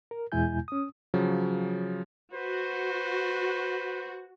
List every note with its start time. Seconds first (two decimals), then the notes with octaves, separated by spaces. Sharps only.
0.11 A#4
0.32 E2 B2 G#3 E4 G#5 G6
0.68 C#4 D#6
1.14 C#3 F3 F#3
2.33 F#4 B4 C5